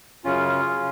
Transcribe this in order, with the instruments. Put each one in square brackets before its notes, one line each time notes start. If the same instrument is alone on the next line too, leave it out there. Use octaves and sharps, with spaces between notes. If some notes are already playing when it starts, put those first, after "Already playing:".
[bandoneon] F#2 C#3 C#4 F4
C#3